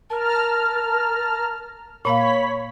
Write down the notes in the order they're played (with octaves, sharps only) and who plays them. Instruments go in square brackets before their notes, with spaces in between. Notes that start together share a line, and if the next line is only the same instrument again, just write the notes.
[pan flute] A#4 [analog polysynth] A5 A#5 F6
[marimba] A#2 A#3 F5 [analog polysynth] C#5 B6 [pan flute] B5